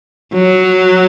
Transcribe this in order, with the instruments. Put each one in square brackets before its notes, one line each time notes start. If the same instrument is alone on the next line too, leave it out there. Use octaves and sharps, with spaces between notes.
[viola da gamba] F#3